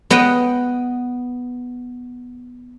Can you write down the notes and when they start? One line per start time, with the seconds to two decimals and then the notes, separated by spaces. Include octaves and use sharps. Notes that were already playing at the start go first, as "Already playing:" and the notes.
0.10 B3 D#5 F#5 G5